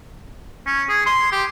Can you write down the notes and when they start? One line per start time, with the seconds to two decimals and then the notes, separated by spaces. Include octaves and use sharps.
0.67 C#4
0.89 G#4
1.06 C6
1.32 G4